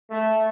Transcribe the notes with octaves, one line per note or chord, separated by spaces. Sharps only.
A3